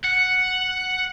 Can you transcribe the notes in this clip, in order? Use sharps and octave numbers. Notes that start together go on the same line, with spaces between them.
F#5